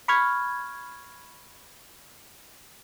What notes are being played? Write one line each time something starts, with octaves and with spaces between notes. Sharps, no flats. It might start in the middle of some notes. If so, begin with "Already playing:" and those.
B5 C#6 F6 G#6